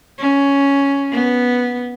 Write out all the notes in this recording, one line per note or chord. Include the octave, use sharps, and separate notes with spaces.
C#4
B3